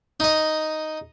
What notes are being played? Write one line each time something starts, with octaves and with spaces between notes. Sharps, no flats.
D#4 D#5